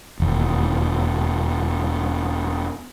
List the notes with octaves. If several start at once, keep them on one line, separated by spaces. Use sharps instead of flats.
E1 D#2